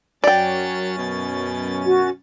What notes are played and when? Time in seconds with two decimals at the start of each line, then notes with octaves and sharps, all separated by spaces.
0.24 F#2 F#3 C#4 D5 G5 A6
0.97 B2
1.85 F#4